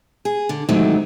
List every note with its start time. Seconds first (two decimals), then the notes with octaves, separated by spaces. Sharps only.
0.25 G#4
0.49 D3
0.69 G#2 C3 D#3 E3 F#3 A3